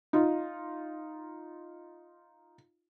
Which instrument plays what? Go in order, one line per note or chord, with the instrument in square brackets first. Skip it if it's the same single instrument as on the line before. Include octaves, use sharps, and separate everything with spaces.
[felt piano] D#4 F4